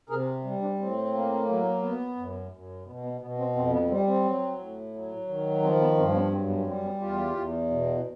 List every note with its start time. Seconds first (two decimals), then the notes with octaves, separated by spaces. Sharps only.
0.09 C3 G#4 A#4
0.44 G3
0.61 C4 D4
0.79 A2 C4
1.13 A#3
1.49 F#3
1.82 B3
2.17 F#2
2.51 F#2
2.86 B2 B3
3.04 B3
3.21 B2 B3
3.39 C4
3.56 F2 C4
3.73 B3
3.90 G3 C4
4.07 C4
4.25 F#3
4.59 A2
4.94 F#3
5.28 D#3
5.63 F3 C4
5.81 B3
5.98 G2 C4
6.14 B3 C#4
6.32 F#2 C4
6.49 B3
6.67 G3 C4
6.84 B3 C#4
7.01 E2 F4 G4
7.36 E2
7.70 B2